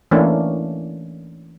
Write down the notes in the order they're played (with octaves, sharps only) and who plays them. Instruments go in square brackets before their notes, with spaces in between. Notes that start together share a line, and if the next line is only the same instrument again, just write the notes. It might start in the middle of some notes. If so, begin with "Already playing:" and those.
[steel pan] E3 A3 A#3 C#4 D4